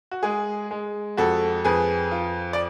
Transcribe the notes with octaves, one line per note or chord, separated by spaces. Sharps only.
F#4
G#3 G#4
G#3
F2 F#4 A4
F2 G#4 B4
F4
D5